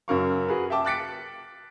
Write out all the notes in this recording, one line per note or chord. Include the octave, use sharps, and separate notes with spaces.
F#2 C#3 F#3 A#4 F5 C#6
F#4 G#4 B4
E5 G5 A5 D6
D6 F#6 A6 B6 C#7 D7